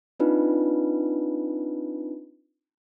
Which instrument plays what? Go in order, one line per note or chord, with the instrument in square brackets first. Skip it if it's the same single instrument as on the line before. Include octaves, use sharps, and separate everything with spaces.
[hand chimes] C4 D4 D#4 F4 B4